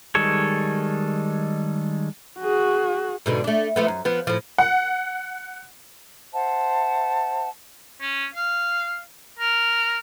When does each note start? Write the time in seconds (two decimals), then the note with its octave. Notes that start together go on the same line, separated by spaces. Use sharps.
0.15 D#3 G3 G#3 A4 C#5
2.40 F#4 G#4
3.26 G#2 B2 D3
3.44 A3 D4
3.76 F3 A3 B3
3.88 F#2
4.05 F3 B3
4.27 A2 F3
4.58 F#5
6.33 C5 E5 F#5 A5
8.01 C#4
8.35 F5
9.39 A#4